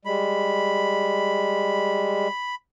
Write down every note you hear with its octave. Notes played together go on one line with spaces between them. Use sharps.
G3 G#3 B5